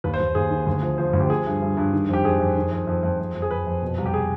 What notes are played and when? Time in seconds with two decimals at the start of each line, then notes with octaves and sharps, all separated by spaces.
0.04 D#2 B4
0.14 C5
0.20 D#2
0.35 D#2 G#4
0.50 D#3
0.67 D2
0.82 F3
0.98 F3 C5
1.13 D2
1.20 G4
1.30 F3 G#4
1.46 G2
1.62 G2
1.77 G2
1.93 D#3
2.09 F2 G4
2.24 F2 G#4
2.40 F2
2.57 D#3
2.71 F2
2.87 F2
3.03 F2
3.20 F2
3.35 F2
3.42 G#4
3.50 F2 B4
3.66 F2
3.82 B2
3.98 C2
4.06 G4
4.14 G#4